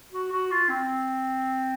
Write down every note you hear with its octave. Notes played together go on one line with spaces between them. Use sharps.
F#4
F#4
F4
C4